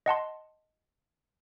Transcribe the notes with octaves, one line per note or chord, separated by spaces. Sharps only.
D#5 F#5 A5 C6